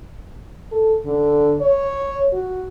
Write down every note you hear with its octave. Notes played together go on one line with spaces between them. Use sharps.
A4
D3
C#5
F#4